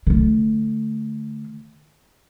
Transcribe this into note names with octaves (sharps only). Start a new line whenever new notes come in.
D3 A3